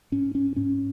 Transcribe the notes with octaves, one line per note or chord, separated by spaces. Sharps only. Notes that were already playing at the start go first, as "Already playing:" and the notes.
G#2 C#4
C#4
G#2 C#4